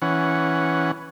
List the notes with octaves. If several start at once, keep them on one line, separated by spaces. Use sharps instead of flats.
E3 C#4 F#5